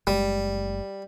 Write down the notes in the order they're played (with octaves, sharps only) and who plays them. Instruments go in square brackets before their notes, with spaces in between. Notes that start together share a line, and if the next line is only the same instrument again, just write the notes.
[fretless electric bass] F#1 G#3 [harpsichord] G3